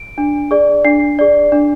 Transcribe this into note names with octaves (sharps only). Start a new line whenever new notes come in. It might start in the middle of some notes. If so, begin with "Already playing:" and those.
Already playing: D7
D4
G#4 D5
D4 C7
G#4 D5
D4